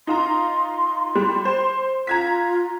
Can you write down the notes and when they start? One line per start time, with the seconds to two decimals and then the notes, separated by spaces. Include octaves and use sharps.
0.07 D#4 F4 A#5 C6
1.15 G3
1.45 C5
2.07 F4 A#5 G#6 B6